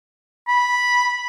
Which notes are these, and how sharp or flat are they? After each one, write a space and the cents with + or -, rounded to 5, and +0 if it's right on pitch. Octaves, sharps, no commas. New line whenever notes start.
B5 -10